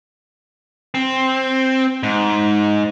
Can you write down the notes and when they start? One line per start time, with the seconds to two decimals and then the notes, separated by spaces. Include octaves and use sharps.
0.95 C4
2.03 G#2